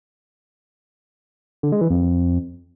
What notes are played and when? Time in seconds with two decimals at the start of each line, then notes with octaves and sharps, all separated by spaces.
1.63 D3
1.72 G#3
1.81 E3
1.90 F2